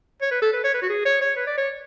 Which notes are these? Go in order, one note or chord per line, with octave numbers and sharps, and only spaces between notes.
C#5
B4
A4
B4
C#5
B4
F#4
G#4
C#5
C#5
B4
D5
C#5